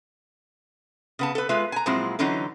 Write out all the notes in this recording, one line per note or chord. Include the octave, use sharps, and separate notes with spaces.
C#3 B3 A5
A4 B4
G#3 F4 B4 E5
G#5 A#5
A#2 F3 F#3 G#3 C4 E4
D3 E3 F#3 C#4 D#4